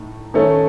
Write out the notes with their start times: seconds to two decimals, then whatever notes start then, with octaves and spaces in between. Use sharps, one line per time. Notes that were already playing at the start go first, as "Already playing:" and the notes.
Already playing: A2 A3 D#4
0.34 D#3 A3 C#4 A4